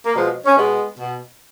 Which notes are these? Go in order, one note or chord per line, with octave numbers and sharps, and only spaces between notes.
A#3
B2 F3 G#3
C#4
B2 G#3 B3
B2